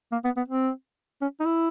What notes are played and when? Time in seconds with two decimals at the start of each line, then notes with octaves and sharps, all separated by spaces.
0.12 A#3
0.24 B3
0.37 B3
0.48 C4
1.22 C#4
1.40 D#4
1.45 E4